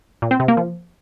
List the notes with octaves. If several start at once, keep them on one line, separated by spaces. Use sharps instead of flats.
A#2
C4
C3
A#3
F3